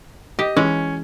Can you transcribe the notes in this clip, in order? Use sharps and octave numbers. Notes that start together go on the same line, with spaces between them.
G4 D#5
E3 G#3 C#4 F#4